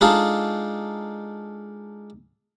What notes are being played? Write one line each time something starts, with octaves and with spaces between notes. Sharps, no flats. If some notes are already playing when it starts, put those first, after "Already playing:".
G#3 D4 D#4 F4 G#4 A4